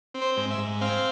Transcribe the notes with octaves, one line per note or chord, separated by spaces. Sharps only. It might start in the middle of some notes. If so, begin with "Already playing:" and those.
C4
C5
G#2
E5
G#2
C4 F5